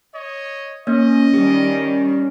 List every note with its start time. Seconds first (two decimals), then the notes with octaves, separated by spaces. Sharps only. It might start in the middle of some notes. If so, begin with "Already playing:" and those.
0.15 C#5 D#5
0.87 A#3 C#4 D#5
1.34 D#3 G3 G4